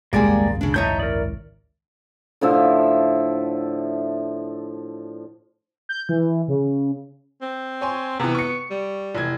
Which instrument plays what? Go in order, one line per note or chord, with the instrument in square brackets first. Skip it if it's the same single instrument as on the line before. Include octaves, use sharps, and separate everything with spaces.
[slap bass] G#1 C#2 F#2 [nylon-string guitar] G3 G#3 G#4 [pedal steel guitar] A#3 D5
[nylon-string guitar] C#3 D4
[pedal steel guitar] D#4 A5 G6 [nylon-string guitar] E4 C#5 E5
[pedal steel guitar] A#4 D5
[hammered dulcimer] A2 D3 F3 E5
[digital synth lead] G6
E3
C#3
[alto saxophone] C4
[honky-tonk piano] C#5 G#5 C6
[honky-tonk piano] C3 E3 [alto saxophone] B3
[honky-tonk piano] C#6 C#7
[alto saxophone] G3
[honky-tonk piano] F1 E3 G#6